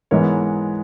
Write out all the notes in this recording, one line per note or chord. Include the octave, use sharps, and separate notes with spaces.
G#2 E3 G#3 B3 A#4 C#5